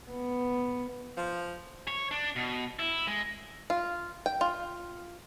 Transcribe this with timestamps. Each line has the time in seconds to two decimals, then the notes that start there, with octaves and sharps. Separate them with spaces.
0.11 B3
1.17 F3
1.88 C#5
2.11 D4
2.36 B2
2.79 E4
3.07 G#3
3.70 F4
4.26 G5
4.41 F4